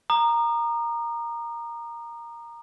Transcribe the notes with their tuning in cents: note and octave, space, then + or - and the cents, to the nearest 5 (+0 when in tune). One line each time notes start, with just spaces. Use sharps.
A#5 +0 D#6 -40